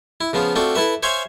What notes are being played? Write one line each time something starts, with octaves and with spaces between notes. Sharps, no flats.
E4
C#3 F3 B3 F4
A3 C4 D4 F4 F#4
E4 A4 B4 E5
C5 C#5 E5 F5 G#5 C6